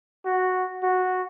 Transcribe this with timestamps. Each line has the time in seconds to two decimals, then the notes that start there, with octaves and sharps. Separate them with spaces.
0.25 F#4
0.83 F#4